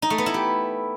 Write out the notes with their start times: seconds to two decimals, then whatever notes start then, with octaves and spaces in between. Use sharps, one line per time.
0.02 D#4
0.10 A3
0.18 B3
0.26 E4
0.34 G4